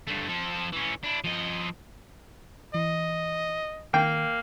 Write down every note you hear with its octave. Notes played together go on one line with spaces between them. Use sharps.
G2 A3
F3 A4
E3 C#4
D4 E4
F3 D#5
E3 D#5
D#3 A#3 G5